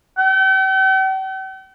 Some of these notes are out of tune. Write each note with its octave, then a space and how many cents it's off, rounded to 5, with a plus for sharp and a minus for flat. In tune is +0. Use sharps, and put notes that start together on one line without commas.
G5 -45